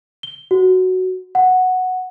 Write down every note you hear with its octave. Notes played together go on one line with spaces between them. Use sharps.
G7
F#4
F#5